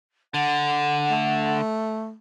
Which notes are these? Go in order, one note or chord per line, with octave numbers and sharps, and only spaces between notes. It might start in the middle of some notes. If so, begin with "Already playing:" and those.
D3 F#5
A3